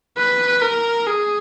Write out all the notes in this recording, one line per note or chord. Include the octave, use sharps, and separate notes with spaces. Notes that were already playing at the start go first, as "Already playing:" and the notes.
B4
A#4
G#4